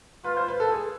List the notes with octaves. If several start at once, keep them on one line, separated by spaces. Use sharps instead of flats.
F4 B4
C5
B4
A4
G#4